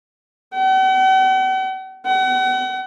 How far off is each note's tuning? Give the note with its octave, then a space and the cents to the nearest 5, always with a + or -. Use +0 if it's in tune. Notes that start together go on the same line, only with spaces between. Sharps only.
F#5 +45
F#5 +40